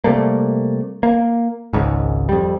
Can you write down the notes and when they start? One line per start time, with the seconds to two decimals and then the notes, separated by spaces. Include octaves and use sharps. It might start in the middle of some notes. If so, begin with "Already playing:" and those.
0.04 C3 G3 A3 A#3
1.03 A#3
1.73 G#1 C#2 G#2
2.29 F2 G3